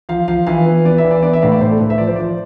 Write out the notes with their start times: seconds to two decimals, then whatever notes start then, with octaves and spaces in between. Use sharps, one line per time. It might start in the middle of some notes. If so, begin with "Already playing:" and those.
0.09 F3 F5
0.28 F3 F5
0.47 E3 F5
0.66 B3
0.85 B3 D5
0.98 E5
1.05 E3
1.11 D5
1.23 B3 D5
1.33 E5
1.42 A2 F5
1.52 D5
1.61 A2 C5
1.71 A4
1.80 A2 B4
1.90 E5
1.98 F3 D5
2.07 C5
2.16 F3 D5